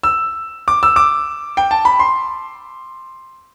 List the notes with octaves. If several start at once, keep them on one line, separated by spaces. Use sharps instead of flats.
E6
D6
E6
D6
G5
A5
B5
C6